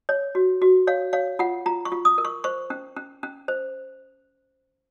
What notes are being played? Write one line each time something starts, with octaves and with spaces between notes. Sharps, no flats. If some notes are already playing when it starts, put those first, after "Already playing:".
C#5
F#4
F#4
C#5 F5
C#5 F5
F4 F#5
F4 A#5
C#6
F4
D#6
A#4
C#6
C5 C#6
C#4
C#4
C#4
C5